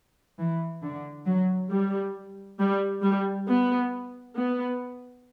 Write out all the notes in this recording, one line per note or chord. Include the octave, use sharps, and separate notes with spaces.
E3
D3
F#3
G3
G3
G3
B3
B3